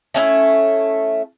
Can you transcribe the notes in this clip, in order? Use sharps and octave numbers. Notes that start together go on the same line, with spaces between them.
A3 C#4 D#4 E4